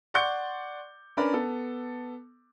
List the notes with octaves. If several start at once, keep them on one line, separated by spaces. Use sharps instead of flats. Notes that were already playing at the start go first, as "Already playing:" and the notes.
D5 F#5 C6 C#6 G6 C#7
C#4 D4 A#4 B4 D5 B5
B3 A4